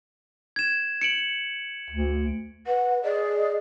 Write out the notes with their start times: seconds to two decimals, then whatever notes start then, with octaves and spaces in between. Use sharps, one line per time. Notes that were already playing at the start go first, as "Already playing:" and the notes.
0.56 G#6 E7
1.01 C#7 D7 F#7
1.90 D2
2.67 B4 F#5
3.03 G#4 D5 D#5